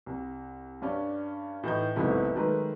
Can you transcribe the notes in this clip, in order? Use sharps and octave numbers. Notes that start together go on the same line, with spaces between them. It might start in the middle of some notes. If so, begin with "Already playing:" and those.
C2
G2 C#4 D4
A2 E3 D#4 G6
F#1 C2 G#2 A3 B3 E4
D#3 F#3 G#3 A3 A#4 B4